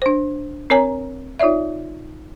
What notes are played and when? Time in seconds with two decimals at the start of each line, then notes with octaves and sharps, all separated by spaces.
0.02 D4 C5
0.70 C4 A#4 C#5 G#5 A#5
1.39 D#4 F4 C#5 D5 E5